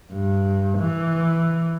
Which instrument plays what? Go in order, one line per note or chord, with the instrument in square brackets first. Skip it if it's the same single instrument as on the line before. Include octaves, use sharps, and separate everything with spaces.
[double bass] G2
E3